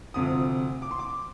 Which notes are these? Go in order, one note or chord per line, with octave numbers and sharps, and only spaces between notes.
D2 C3 F3 D#6
D6
C6
D6